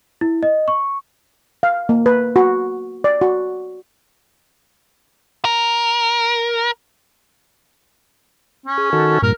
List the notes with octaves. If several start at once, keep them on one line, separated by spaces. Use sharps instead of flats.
E4
D#5
C#6
F5
A#3
B4
F#4
D5
F#4
A#4
C#4
G#4
D#3 F#4 A4
G2 A#2 A#4